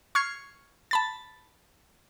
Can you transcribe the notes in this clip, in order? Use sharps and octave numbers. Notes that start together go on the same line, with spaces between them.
C#6 F6 G#6 C7
A5 B5 A6